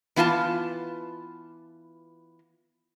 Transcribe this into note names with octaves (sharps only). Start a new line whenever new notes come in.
E3 B3 F4 G#5 A5